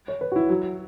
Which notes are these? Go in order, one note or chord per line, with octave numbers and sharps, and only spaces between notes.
C#5
B4
F#4
E4
F#3